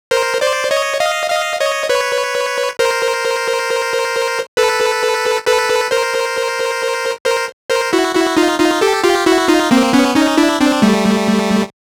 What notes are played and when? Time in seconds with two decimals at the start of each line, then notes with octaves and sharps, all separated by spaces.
0.11 A#4 C5
0.41 C5 D5
0.71 C#5 D#5
1.00 D#5 F5
1.30 D#5 F5
1.60 C#5 D#5
1.89 B4 C#5
2.79 A#4 C5
4.57 A4 B4
5.47 A4 B4
5.91 A#4 C5
7.25 A#4 C5
7.70 A#4 C5
7.93 E4 F#4
8.15 E4 F#4
8.37 D#4 F4
8.59 D#4 F4
8.81 G4 A4
9.04 F4 G4
9.26 E4 F#4
9.48 D#4 F4
9.71 A#3 C4
9.93 B3 C#4
10.15 C#4 D#4
10.37 D4 E4
10.61 C4 D4
10.82 G3 A3